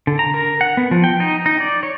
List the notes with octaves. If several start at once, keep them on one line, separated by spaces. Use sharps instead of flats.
D3
A#5
A#4
F#5
B3
F3
G5
D#4
D#4
D5
C#5